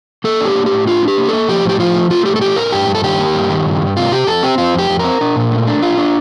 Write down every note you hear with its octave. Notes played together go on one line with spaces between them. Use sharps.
A#3 A4
D4
G4
A#3
A2 G4
D4 F4
D4
G4
A#3
A#3 A4
F3 G4
A2 G4
F3 F4
A3
A3 F4
A2 G4
A4
A3 G4
A2 A#4
G2 G4
G2
A4
D#3 G4
A#3
G2
D#3
G2
G2
C3 F4
C3 G4
F2 A4
C4 G4
C4 F4
F2 G4
F2
A#4
C4
D4
A#2
A3
D4
F4
D4